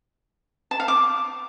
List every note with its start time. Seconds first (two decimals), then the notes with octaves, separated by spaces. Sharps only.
0.71 A5
0.80 F5
0.88 D6